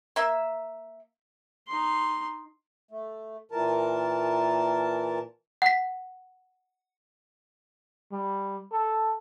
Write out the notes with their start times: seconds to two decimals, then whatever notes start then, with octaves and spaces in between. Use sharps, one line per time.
0.16 A#3 E5
1.68 D#4 C6
2.91 A3
3.51 A#2 E3 A#4 A5
5.62 F#5 B6
8.12 G3
8.72 A4